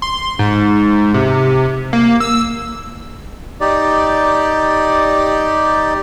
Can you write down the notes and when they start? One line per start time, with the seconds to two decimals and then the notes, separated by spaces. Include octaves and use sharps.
0.02 C6
0.39 G#2
1.14 C3
1.93 A#3
2.20 E6
3.61 D#4 G4 D5